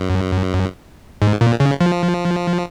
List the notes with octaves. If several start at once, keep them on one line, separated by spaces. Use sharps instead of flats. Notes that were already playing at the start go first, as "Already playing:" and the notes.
Already playing: F#2
G#2
A#2
C#3
F3